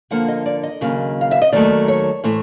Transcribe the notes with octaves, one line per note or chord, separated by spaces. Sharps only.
D3 F3 A#3 F#5
D#5
D5
D#5
D#2 C#3 F#3 A#3
F5
E5
D#5
D#2 D#3 F#3 A3 D5
C#5
A2 E3 A3 C5